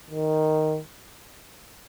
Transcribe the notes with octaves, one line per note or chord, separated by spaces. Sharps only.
D#3